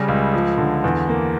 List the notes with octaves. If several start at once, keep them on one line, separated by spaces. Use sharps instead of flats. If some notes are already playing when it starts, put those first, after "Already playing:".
Already playing: C#3 G3 A#6
C#2
F3
D3
E2
A#3